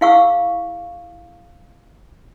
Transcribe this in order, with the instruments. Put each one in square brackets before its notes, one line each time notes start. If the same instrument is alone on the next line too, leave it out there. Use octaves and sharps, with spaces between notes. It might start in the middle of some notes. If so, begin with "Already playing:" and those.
[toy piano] E4 G#4 F5 F#5 C#6 E6